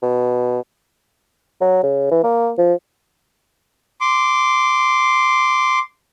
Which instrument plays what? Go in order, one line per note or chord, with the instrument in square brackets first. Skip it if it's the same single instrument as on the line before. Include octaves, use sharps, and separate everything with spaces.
[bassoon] B2
F#3
C#3
E3
A#3
F3
[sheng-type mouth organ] C6 D6